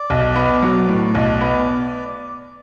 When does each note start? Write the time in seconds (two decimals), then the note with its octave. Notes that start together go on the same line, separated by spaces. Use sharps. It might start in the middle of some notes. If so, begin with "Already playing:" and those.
Already playing: D5
0.10 B1
0.36 B3
0.62 F#3
0.88 A2
1.15 B1
1.41 B3